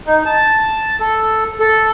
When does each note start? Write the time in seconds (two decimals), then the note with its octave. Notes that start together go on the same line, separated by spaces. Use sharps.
0.06 D#4
0.26 A5
1.00 A4
1.60 A4